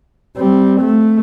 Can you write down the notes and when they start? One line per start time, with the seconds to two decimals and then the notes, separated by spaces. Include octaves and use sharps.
0.37 G3 C4
0.80 A3